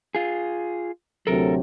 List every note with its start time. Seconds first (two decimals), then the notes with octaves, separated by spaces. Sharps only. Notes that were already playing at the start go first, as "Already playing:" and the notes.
0.15 F4 G#4
1.27 D2 C3 F#3 A4 A#4